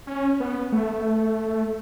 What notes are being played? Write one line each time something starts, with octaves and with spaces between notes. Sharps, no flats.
C#4
B3
A3